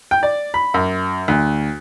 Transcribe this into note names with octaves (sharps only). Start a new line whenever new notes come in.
G5
D5
B5
F#2
D2